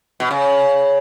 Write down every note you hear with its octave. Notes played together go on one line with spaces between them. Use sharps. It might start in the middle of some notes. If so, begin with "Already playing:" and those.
B2
C#3